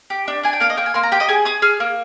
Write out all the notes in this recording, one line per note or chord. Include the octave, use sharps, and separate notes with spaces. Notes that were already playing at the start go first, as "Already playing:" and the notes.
G4
D4
D4 G#5
G5
A#3 F5
D#5
A#3 G5
G#5
A#3 C6
A#5
G4 G5
D#5
G#4 G#5
G#4 D#6
G#4 F6
A#3